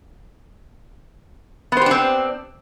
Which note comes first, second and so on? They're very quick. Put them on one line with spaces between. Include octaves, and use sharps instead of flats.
B3 C5 G4 D4 C4